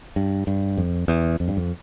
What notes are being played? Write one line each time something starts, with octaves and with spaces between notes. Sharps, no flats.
G2
G2
F2
E2
F2
G2
F2